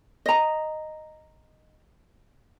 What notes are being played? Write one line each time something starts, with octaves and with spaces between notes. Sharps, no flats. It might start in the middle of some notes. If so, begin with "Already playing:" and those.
D#5 A#5